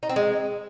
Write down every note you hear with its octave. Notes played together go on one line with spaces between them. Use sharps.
D#4
C4
G#3